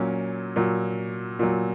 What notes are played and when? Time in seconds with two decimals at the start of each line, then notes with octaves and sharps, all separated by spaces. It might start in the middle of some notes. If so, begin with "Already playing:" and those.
Already playing: A#2 F#3 A#3 C#4
0.56 A#2 F#3
1.39 A#2 F#3